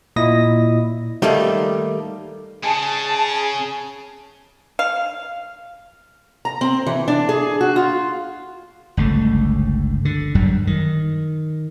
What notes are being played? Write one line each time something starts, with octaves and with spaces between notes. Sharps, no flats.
A#2 E4 D#5 D#6 A#6
D#3 G3 A3 A#3 D#4
C#3 G#4 A5
F5
A#5
C4
E3
D4
G#4
F#4
F4
G1 C#2 D3 A3
D3
G1 F#2 F#3 G3
D#3